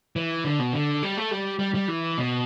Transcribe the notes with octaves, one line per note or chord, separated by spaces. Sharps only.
E3
D3
B2
D3
G3
A3
G3
G3
G3
E3
B2